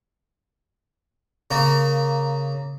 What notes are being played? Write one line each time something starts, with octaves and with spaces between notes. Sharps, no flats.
C#3 A#3